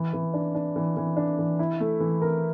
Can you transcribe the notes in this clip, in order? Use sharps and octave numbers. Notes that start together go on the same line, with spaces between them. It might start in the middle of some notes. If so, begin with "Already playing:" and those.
Already playing: E3
E3
D4
D4
E3
E3
D4
E3
E4
A3
E3
A#4